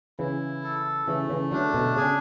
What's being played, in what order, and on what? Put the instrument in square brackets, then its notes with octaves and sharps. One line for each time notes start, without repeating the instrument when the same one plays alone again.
[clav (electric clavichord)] C#3 E3 [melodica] E4
[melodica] A4
[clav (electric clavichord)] C#3 E3 [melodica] A3
[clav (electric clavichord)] C#3 E3
[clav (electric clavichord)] D3 F#3 [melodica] D4
[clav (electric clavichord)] B2 D3
[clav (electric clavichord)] C#3 [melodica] G#4